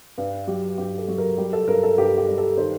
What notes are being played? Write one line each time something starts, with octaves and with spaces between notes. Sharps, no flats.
G2
F#3 G4
G2 G4
A4
F#3
A#4
G3 G4
A4
G2 A#4
A4
G2 G4
G4
G3
A4
D#3 C5